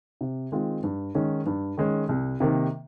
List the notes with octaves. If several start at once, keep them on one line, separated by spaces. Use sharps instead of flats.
C3
D#3 G#3 C4 F4
G2
D#3 G#3 C#4
G2
D#3 G#3 C#4
C2
C3 D#3 A#3